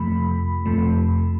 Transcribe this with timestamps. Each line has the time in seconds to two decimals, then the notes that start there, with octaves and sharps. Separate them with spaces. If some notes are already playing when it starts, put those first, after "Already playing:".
Already playing: F2 C3 F3 A3 B5
0.66 F2 C3 F3 A3